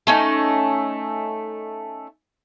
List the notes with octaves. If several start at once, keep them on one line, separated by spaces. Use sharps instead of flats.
A3 C#4 D#4